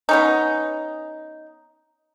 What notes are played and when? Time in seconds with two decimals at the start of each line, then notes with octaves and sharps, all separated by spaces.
0.09 B3 C#4 D#4